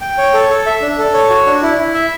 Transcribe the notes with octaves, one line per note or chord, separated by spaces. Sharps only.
G5
C#5
A4
A4
E5
D4
A4
C#5
F#4
D4
E4
E4
E5